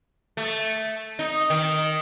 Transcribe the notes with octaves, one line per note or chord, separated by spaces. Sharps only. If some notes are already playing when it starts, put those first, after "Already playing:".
A3
D#4
D#3